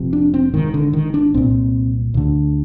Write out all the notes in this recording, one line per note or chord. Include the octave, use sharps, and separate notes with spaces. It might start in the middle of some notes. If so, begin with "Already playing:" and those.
Already playing: F1 F2 C3
D4
C4
G#1 G#2 D#3
D3
D#3
D4
C2 A#2 C4
D2 D3